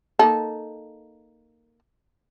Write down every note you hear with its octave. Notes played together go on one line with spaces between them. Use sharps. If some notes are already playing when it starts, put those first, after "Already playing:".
A#3 D#4 A4